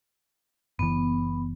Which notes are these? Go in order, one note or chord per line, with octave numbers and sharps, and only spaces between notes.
F#1 E3 B3